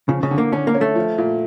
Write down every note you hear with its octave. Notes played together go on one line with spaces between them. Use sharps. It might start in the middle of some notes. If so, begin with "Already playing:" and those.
C#3 F3
C#3
D3
A#3
D3 C#4
A#3
C#4
A3
F3
A#2